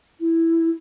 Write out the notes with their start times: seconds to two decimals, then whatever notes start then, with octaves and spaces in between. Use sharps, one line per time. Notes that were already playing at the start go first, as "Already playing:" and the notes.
0.20 E4